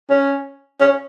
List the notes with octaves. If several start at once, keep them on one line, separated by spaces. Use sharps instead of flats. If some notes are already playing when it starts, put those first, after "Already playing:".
C#4
C#4